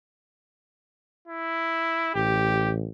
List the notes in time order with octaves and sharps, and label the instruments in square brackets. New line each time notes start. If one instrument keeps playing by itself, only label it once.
[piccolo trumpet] E4
[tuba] A1 [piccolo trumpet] G4